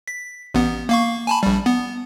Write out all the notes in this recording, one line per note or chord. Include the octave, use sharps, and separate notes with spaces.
B6
A1 B3
A#3 F5 C#6
G#5 A5 B5
A#1 G3
B3